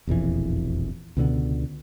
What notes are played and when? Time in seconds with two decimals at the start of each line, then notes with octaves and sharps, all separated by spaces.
0.07 E1 A#1 F2 E3
1.17 C#2 B2 D3 B3